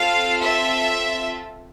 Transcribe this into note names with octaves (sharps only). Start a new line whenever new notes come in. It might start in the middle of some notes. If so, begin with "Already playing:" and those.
Already playing: C4 F4 A4 F5
E5